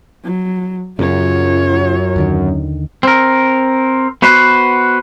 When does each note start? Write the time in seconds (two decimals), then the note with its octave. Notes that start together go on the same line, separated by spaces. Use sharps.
0.24 F#3
0.99 F#2 C#3 F4 C#5
2.16 D#2 D3 D#3
3.03 C4 A#4
4.22 B3 F#4 B4 C5